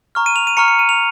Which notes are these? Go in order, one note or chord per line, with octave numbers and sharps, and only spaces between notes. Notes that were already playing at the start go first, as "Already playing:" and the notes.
A#5 C#6 F6
D#7
F7
D#7
A#5 C#6 F6 C#7
C#7
D#7
F7